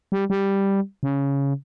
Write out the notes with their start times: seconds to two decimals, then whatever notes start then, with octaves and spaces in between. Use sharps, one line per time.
0.12 G3
0.30 G3
1.03 C#3